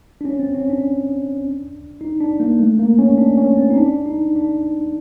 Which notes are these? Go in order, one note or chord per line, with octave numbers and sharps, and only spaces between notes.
D4
C#4
C4
C#4
D4
D#4
D4
A#3
A3
A#3
C#4
D4
C#4
C4
D#4
D4
D#4
D4